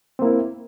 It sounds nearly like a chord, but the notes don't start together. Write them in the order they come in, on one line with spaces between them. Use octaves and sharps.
C4 A#3 E4